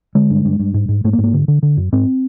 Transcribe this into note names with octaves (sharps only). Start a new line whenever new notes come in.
D3 G#3
G2
G2
G2
G#2
G#2
G#2 A3
A#3
G#2
A#3
D3
D3
D3
F#2
G#2 C4